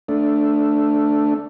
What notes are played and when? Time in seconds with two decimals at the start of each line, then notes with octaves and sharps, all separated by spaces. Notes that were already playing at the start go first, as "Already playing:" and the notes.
0.09 A3 D4